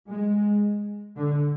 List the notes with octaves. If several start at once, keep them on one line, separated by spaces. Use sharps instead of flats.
G#3
D3